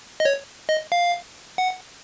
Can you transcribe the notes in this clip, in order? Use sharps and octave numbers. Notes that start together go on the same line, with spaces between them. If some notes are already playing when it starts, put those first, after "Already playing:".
D#5
C#5
D#5
F5
F#5